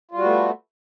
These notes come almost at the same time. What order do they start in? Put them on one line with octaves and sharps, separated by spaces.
F4 G3 F#4 B3 A3